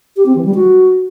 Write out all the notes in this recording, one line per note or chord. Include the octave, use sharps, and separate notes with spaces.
G4
C4
E3
G3
F#4